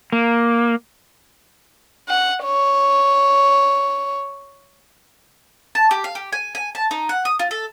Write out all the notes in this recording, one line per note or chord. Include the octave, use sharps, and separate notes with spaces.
A#3
F#5
C#5
A5
G4
F5
G4
G#5
G#5
A5
D#4
F#5
D#6
F4
A4